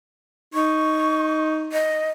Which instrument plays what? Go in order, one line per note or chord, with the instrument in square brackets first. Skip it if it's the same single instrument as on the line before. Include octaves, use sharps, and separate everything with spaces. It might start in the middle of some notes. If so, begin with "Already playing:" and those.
[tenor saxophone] D#4 [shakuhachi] C#6
[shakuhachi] D#5